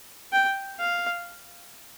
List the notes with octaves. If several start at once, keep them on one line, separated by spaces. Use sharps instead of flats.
G5
F5